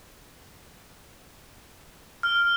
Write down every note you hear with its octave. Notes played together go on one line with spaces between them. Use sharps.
F6